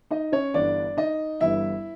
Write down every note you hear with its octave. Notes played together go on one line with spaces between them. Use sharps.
D#4 D#5
C#4 C#5
G1 G2 E3 D4 D5
D#4 D#5
G1 G2 E3 E4 E5